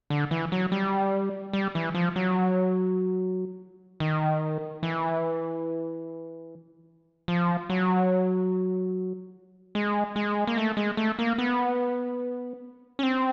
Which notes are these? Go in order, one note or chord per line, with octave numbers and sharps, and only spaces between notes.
D3
E3
F#3
G3
G3
E3
F3
F#3
D#3
E3
F3
F#3
G#3
G#3
A#3
A3
G#3
A3
A#3
B3
C#4
C4